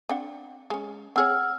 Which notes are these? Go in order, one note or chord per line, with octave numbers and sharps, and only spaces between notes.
C4 D4 F#5
G#3 C#4
C4 G#4 C#5 F#5 E6 F6